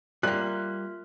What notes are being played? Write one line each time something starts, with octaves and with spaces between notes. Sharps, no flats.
G3 A#3 F4 A#4 E5 F#6